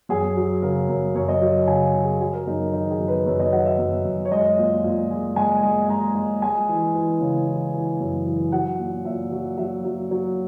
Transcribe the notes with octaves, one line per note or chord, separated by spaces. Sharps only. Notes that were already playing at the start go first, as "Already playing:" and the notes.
F#2 G#4
F#3
C#3 A#4
F#2
F#2 C#5
D#5
F#3
C#3 G#5
C#3
G#4
F#3 G#4
A#4
F#2 D#4
D#3 D#4
G#4
F#2
B4
F#2 C#5
D#5
F#3 F#5
E5
F#2
F#2
C#5
G#3 D#5
A#2
A#2
G#3
G#3 G#5
G#3
G#3 A#5
G#3
G#3 G#5
E3
E3
C#3
E3
E3
F#2
E3
F#3 F#5
A#2
A#2 E5
F#3
F#3 E5
F#3
F#3